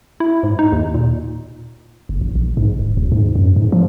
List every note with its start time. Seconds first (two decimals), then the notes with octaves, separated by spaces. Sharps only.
0.20 E4
0.43 G#2
0.59 D#4
0.72 D#2
0.94 A#2
2.09 F#1
2.21 A1
2.35 A#1
2.57 G#2
2.79 D1
2.97 D2
3.12 G#2
3.35 F#2
3.56 G#2
3.72 F3